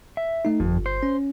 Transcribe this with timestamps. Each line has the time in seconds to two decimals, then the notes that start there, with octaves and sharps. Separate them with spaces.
0.17 E5
0.45 A3 D#4
0.60 G1 F2
0.86 C5
1.03 C#4